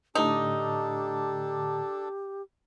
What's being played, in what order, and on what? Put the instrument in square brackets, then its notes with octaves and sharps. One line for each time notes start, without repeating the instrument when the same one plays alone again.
[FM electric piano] A2 D3 [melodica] D4 A4 [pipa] D#4 [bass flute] G4